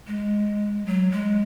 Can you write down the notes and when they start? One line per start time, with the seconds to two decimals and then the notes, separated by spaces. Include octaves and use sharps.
0.07 G#3
0.86 F#3
1.12 G#3